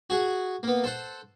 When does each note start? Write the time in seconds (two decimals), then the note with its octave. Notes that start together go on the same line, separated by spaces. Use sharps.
0.10 F#4 G#4 F#5
0.63 A#3 B3
0.84 A4 C5 F#5